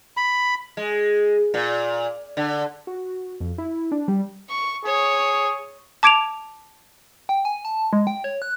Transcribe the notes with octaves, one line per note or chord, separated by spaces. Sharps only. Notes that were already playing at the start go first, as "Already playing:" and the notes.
B5
G#3
A#2
D3
F#4
F2
E4
D4
G3
C#6
G#4 C#5
A5 D6 G#6 D7 E7 F7
G5
G#5
A5
G#3
G5
C#5
F#6